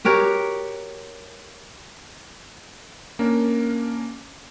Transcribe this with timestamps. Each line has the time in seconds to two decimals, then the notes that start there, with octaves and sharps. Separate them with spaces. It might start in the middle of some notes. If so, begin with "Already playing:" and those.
0.05 F#4 G4 A#4 C#5
3.19 A#3 C#4 D4 A#4